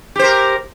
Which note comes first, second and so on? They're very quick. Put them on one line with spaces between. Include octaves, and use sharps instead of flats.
G4 C5 A#4